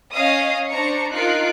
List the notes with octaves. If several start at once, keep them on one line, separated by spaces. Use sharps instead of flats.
C#4 C#5 D#5 F5 D#6
D4 C5 A#5 C#6 C#7
D#4 F4 A#4 F#6 C7 D7